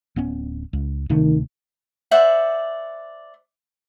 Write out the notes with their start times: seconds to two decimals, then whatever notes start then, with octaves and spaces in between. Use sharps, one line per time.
0.16 D1 B3 C#4
0.73 C#2
1.09 D1 C3 D#3 A3
2.11 C5 D5 E5 F#5